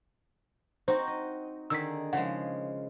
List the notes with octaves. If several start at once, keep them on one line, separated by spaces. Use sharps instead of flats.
C4 D#4 F#4 C5
D#5
D3 D#3 G#4 E6 B6
C#3 F3 G#3 F#5